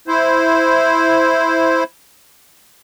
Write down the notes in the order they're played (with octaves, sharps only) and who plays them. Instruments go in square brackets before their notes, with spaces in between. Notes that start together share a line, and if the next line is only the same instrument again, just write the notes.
[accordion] E4 C5